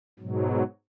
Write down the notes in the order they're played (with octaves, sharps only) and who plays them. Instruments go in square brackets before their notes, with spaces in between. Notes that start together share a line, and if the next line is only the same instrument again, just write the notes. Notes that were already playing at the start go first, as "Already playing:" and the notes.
[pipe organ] G#2 B2 F#3